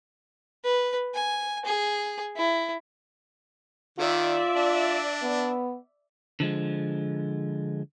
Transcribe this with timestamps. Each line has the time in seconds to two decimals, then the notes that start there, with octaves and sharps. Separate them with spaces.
0.65 B4
1.14 G#5
1.66 G#4
2.36 E4
3.99 D#3 F4 D5 E5
4.56 D4
5.22 B3
6.40 D3 F3 G#3